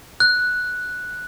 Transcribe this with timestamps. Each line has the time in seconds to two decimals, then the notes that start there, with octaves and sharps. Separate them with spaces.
0.20 F#6